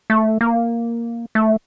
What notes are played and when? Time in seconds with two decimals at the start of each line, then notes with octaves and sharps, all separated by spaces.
0.10 A3
0.41 A#3
1.35 A3